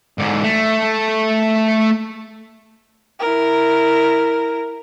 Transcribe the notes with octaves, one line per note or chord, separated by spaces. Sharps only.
G#2 D3
A3
E4 A#4